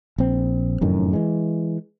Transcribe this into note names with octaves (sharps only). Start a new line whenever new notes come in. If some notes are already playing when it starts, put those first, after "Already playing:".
A#1 C4
F1 F#2 A2 D#3
E3 G#3